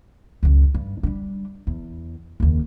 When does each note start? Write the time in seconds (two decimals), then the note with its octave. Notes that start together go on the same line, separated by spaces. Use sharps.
0.43 C#2 F#2
0.75 G2
1.03 G3 D4
1.67 E2
2.40 F#1 D#2